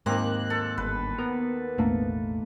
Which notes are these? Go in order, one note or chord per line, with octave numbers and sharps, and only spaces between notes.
D#2 G#2 A#3 C4 D#4 F#6
A4
G1 B4
B3 A#4
E1 A1 A3 A#3 D4